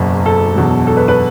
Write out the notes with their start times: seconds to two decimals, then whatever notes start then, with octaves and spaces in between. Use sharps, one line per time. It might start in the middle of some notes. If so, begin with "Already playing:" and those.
Already playing: F#1 E2 B2 F#3
0.26 A4
0.55 E1 E2 B2 F#3
0.87 A4
0.97 B4
1.08 B4